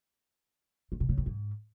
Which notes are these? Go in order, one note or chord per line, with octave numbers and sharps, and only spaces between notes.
G2
C3
C#3
F2
G#2